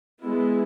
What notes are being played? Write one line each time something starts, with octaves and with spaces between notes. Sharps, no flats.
G#3 B3 E4